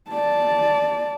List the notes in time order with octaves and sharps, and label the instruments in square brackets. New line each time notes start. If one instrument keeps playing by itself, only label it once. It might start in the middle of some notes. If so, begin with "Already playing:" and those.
[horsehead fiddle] D5 A5